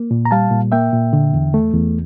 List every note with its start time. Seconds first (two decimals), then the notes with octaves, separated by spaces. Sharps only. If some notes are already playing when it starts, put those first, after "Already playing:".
Already playing: A#3
0.11 A#2
0.25 A#5
0.31 G3 F5 A5
0.51 A#2
0.72 A#3 E5 G5
0.93 A#2
1.13 D3
1.33 E2
1.54 A3
1.74 E2